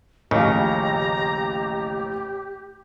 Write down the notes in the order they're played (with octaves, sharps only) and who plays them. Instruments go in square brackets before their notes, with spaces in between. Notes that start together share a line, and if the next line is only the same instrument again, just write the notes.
[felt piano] A1 F3 [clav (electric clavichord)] D#2 C#3 [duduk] G4 [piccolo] A#5